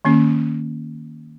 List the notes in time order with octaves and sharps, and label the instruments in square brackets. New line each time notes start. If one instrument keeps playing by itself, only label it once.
[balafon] D#3 A#3 C#4